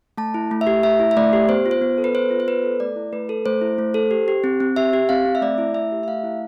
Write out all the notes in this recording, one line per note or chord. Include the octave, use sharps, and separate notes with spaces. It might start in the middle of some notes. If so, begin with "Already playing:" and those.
A3 A5
E4
A3
E5
G4
A3 E5
E4
E5
A3 D5
G4
B3 C5
F4
C5
B3
A4
B4
B3 C5
F4
C5
B3 B4
A4
A3 D5
E4
A3 B4
A4
A3 C5
E4
A3
A4
G4
G4
C4
C4
G4 E5
G4
C4 F5
C4
E5
A3 D5
E4
A3 E5
G4
E5
A3 F5
E4